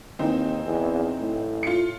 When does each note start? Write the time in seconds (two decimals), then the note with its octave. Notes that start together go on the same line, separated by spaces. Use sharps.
0.19 D#2 E3 C4 D#4
0.66 E2
1.20 A2
1.63 F4 C#7